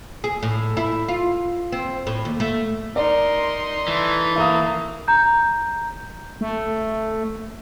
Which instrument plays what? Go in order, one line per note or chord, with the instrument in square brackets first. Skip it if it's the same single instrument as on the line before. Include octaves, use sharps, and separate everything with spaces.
[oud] G#4
A2
E4
F4
C4
A2
D#2
A3
[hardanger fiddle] D#4 C6 [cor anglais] A#4 [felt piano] D5
[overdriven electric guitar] E3 [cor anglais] A3
[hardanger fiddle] A#3 [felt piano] E5 F5 D#6
[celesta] A#5 G6
[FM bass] A3